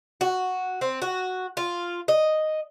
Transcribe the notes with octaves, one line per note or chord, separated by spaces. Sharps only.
F#4
C4
F#4
F4
D#5